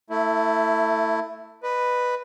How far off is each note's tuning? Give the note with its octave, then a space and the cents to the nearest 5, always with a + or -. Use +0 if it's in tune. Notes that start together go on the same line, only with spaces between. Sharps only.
A3 +25 E4 +0
B4 +0 D#5 -35